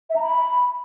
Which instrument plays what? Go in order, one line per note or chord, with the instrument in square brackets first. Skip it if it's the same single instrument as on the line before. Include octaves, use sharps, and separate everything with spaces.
[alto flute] E5
A#5
B5